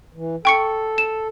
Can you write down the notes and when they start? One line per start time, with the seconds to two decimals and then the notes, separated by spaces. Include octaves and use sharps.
0.14 E3
0.45 A4 G5 C#6 C#7
0.98 E7